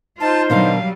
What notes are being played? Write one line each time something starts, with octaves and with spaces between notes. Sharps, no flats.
D#4 F4 C5 A5
B2 D#3 F#3 G3 D4 F5